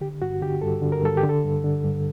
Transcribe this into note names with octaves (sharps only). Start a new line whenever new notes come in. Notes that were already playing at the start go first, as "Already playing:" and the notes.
D3 G4
G2 F#4
D3 G4
G2 A4
D3
A#4
G2 A4
G4
D3
A4
G2
D3
G2